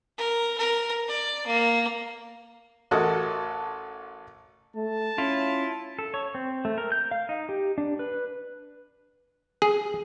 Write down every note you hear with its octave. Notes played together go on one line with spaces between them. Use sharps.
A#4
A#4
D5
A#3
A1 F#4 A4 A#4 D#5
A3 A5
C#4 E4 F4
A4
C#5
C4
A3
A#4
G6
F5
D#4
G4
D4
B4
G#4